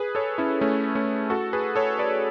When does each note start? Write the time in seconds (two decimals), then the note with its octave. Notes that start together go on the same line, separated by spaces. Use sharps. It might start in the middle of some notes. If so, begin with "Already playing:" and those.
Already playing: G#4 B4
0.15 A4 C#5
0.38 C#4 E4
0.61 A3 C#4
0.95 A3 C#4
1.30 F#4 A4
1.53 G#4 B4
1.76 A4 C#5
1.99 B4 D5